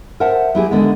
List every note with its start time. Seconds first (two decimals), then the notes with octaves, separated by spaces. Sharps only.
0.20 A#4 C5 E5 F#5 A5
0.55 F#3 E4 G4 G#4
0.71 D3 D#3 G#3 B3